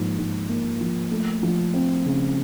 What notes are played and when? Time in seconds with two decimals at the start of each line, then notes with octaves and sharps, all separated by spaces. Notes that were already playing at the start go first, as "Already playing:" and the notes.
Already playing: G#2 F3 A#3
0.18 G#2
0.49 A#3
0.81 F3
1.11 A3
1.43 F3
1.74 C4
2.06 C#3